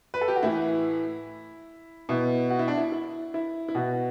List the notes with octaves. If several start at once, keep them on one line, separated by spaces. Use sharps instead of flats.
B4
A4
G4
F#4
A2 E3 E4
B2 E4
F#4
E4
D4
E4
E4
E4
E4
B2 F#4